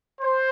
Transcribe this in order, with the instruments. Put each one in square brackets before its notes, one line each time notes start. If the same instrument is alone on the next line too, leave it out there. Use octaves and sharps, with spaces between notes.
[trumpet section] C5